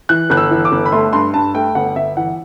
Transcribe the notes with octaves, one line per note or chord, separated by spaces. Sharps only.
E3 F#6
G1 F#6
E6
E3
D6
G1
B5
A3 C6
G2 C6
G2 A5
A3 G5
G1 F#5
G1 E5
E3 F#5